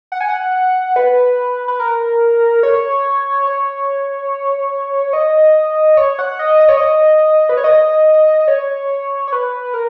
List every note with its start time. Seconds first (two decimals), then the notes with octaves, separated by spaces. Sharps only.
0.12 F#5
0.21 G#5
0.28 F#5
0.96 B4
1.68 B4
1.80 A#4
2.63 C#5
3.47 C#5
5.13 D#5
5.97 C#5
6.19 F#5
6.39 D#5
6.60 D#5
6.69 C#5
6.77 D#5
7.49 B4
7.57 C#5
7.64 D#5
8.40 D#5
8.48 C#5
9.28 C#5
9.33 B4
9.74 A#4